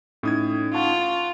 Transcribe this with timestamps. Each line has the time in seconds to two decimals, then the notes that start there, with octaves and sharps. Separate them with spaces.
0.23 A2 C#4 D#4 D#6 G#6
0.74 F4 F#5 A5 C#6